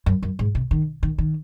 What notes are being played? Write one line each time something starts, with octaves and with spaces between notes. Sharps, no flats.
F#2
F#2
G#2
C3
D#3
D#3
D#3